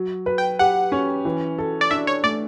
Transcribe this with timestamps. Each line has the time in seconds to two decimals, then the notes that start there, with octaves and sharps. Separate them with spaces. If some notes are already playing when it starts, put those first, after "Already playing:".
Already playing: F#3
0.26 B4
0.38 G5
0.59 G4 F#5
0.92 C#4
1.25 E3
1.58 A4
1.81 D5
1.91 D4 E5
2.07 C#5
2.23 A3 D5